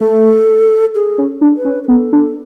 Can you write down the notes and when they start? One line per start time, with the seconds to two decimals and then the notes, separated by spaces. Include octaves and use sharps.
0.01 A3 A4
0.95 G#4
1.18 C#4
1.41 D4
1.57 B4
1.65 C#4
1.83 B4
1.88 B3 A4
2.13 D4